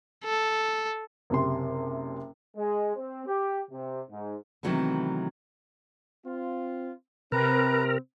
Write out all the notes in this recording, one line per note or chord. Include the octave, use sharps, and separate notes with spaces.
A4
F#1 C3 C6
G#3
C4
G4
C3
G#2
C3 D#3 E3 F#3 A3 B3
C4 F4
C3 C4 A#4 B4 A#5